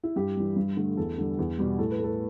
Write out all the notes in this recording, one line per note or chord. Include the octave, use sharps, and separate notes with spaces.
E4
G2 G4
E3 G3
G2
D3 A3
E2 A4
D3 G3
E2
B2 G3
A2 A4
B4
A3 A4